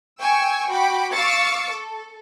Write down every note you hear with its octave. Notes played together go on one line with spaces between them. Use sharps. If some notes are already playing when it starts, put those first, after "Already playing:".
G5 G#5 C#6 E6
F#4 G5 B5 D6
F5 C#6 D6 E6 A6 C#7
A4